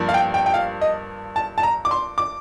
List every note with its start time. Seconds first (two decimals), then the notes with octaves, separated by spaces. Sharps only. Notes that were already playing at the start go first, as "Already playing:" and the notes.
Already playing: G2 F3 A#3
0.09 F5
0.14 G5
0.34 G5
0.46 G5
0.54 F5
0.81 D#5
1.36 A5
1.58 A5
1.63 A#5
1.85 D6
1.91 C6
2.18 D6